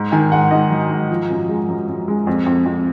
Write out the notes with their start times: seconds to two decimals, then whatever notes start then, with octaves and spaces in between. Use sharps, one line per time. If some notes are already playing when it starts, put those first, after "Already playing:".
Already playing: G#2
0.12 D#3 G#5
0.32 G#2 F#5
0.51 G#2 D#5
0.71 F#3
0.90 G#2
1.09 F3
1.30 F#2
1.48 G#3
1.69 F#2
1.88 F#2
2.08 G#3
2.27 F2
2.46 F2
2.66 F2